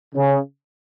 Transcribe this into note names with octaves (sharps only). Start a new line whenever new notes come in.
C#3